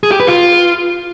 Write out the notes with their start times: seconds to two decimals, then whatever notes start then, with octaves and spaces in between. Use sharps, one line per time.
0.03 G#4
0.11 G4
0.20 B4
0.28 F4